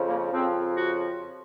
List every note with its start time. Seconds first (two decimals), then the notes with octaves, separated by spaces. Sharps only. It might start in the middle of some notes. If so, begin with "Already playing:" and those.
Already playing: F2 C#3 F3
0.09 A#3
0.32 F2 C#3 F3 C4
0.77 F#4